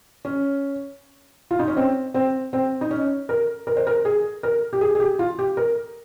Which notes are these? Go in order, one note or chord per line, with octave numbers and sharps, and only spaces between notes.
C#4
F4
D#4
C#4
C4
C4
C4
D#4
C#4
A#4
A#4
C5
A#4
G#4
A#4
G4
G#4
G#4
G4
F4
G4
A#4